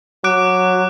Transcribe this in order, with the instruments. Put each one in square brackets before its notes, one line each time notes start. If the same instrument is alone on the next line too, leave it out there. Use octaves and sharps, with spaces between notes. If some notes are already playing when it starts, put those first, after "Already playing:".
[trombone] F#3 [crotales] D6 F#6 D7